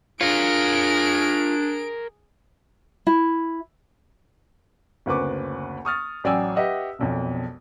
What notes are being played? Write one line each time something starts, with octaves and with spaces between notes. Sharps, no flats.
D4 F4 G#4 A#4 C#5 D7
E4
F#1 D2 C4 B4 C#6 D6
C#6 D#6 F6 A6
A1 F#3 D5 G5 G#5 E6
G4 B4 D#5 E5 F#5
E1 B1 F2